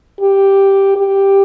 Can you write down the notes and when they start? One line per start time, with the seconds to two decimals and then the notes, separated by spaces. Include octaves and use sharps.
0.20 G4
0.96 G4